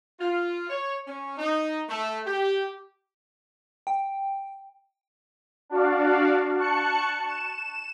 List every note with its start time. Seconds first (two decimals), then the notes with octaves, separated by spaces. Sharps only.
0.20 F4
0.69 C#5
1.07 C#4
1.38 D#4
1.88 A3
2.25 G4
3.87 G5
5.69 D4 F#4 D5 F5
6.57 A5 C#6 F#6 C#7
7.28 E7